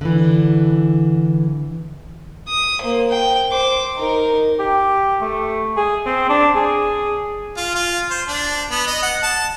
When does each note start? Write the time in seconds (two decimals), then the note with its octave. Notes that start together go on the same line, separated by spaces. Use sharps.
0.01 D3 E3
2.48 D#6
2.81 A#3 C5
3.10 G5
3.51 C5 D6
3.97 D#4 A#4
4.59 G4
5.21 A3
5.77 G#4
6.06 C4
6.29 D4
6.55 G#4
7.57 F4
7.75 F4
8.10 C5
8.28 D4
8.71 B3
8.87 D#5
9.02 F#5
9.23 A5